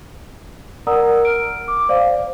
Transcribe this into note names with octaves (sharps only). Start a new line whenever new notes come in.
A#4 D5 F#5 A#5 D#6 E6
F6 D7
D6
C5 D5 F5